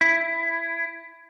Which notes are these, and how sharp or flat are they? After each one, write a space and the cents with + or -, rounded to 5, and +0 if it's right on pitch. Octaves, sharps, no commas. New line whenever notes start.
E4 +15